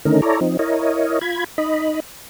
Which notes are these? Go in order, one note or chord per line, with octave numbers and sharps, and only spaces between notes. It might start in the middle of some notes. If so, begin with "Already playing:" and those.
D3 D#3 A3 C#4 D#4 A#4
E4 A4 C#5 D5 A#5
F3 C4 D#4
E4 A#4 C#5 D#5
F4 B5 G#6
D#4 D#5 B5